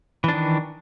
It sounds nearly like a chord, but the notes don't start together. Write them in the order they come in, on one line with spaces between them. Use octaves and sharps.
E3 D4 D#3